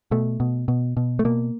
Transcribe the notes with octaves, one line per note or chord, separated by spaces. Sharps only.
B2 A3
B2
B2
B2
A3
B2 A#3